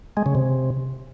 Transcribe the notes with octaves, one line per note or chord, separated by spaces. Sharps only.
G#3
C#3
C3